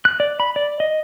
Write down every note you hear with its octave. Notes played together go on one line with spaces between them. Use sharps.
F#6
D5
B5
D5
D#5